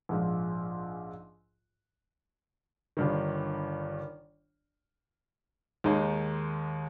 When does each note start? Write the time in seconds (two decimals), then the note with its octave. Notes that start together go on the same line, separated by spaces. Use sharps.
0.09 A#1 G#2 F3
2.97 G1 G2 D#3
5.84 D#2 D#3 G#3 D#4